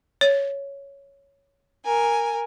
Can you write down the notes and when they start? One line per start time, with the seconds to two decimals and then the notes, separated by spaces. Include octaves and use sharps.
0.21 C#5
1.85 A#4 G#5